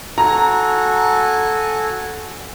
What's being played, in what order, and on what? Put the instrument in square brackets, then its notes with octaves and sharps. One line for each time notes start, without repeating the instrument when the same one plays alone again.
[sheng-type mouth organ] F#4 A4 G#5 [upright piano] A#5